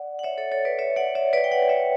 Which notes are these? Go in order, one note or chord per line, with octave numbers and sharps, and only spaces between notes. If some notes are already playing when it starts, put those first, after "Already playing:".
Already playing: D5 F#5
F#5
C#5 E5
A4 C#5
A4 C#5
B4 D5
C#5 E5
D5 F#5
C#5 E5
B4 D5
G5
D5 F#5
C#5 E5